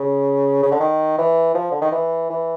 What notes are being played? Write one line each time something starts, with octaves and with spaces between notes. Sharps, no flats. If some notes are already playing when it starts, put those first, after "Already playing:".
Already playing: C#3
C#3
D3
D#3
E3
F3
D3
D#3
E3
E3